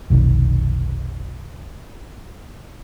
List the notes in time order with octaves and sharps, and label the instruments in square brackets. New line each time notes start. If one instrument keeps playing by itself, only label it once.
[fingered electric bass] F1 B1 D#3